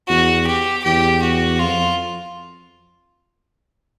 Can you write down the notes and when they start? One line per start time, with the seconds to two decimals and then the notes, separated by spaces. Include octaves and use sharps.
0.08 E2 F#4
0.47 G4
0.84 E2 G4
1.23 F#4
1.59 F2 F4